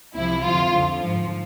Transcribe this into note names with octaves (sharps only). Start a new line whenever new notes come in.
C2 C3 F3 E4
F2 D3 F3 F4
F2 D3 F3
G#2 F3